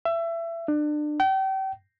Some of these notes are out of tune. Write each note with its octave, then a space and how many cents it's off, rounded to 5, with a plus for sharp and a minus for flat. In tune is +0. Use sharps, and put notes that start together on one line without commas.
E5 +25
D4 +30
G5 -35